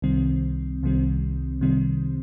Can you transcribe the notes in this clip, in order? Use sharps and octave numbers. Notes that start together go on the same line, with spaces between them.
C2 C3 D#3 G3 C4
C2 C3 D#3 G3 C4
C3 D#3 G3 C4